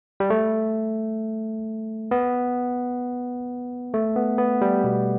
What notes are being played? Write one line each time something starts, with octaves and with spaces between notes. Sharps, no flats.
G3
A3
B3
A3
B3
B3
G3
B2